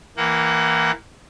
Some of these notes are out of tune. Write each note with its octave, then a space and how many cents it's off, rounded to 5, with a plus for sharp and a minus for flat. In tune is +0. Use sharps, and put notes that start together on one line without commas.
E3 +0 A#3 +0 F#5 +35